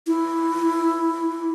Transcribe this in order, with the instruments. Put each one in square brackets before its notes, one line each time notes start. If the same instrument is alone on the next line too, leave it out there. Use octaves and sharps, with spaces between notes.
[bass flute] E4